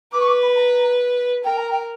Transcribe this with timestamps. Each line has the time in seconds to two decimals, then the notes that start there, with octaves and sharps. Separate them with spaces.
0.12 B4 D6
0.20 C#6
0.27 D6
0.42 B5
0.55 A#5
1.44 A#4 G5
1.57 A#5
1.71 G5